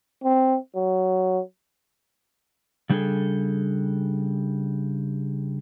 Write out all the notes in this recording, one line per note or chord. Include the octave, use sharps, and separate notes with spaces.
C4
F#3
C#3 G3 D4 F4 G#4 A4